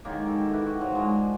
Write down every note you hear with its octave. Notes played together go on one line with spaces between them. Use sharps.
D#3 F#3 G#3 A#3
A4 G5
A#3 E4 B4
F#4
G#2 F3 F#3 A#5
G#3 A#3 D5